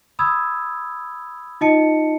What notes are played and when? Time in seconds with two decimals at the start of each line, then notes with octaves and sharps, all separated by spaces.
0.19 B5 D#6 E6 G#6
1.61 D#4 F4 D#5 A5 C#7